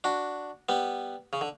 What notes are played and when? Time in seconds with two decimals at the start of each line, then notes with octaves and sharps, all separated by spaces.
0.04 D4 F#4
0.69 G3 B3
1.33 C#3
1.41 D3